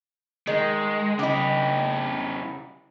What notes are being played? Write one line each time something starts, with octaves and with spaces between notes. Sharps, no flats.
D#3 G#3
C#3 E4 G4 D#5